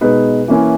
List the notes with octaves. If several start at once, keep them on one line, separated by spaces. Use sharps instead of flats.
B2 G#3 D#4 B4
E3 A#3 C#4 E4